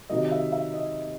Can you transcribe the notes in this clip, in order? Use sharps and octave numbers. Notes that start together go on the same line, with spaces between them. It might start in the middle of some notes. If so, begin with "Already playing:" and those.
C3 D#3 F#3 D#5
D#5
E5
E5
D#5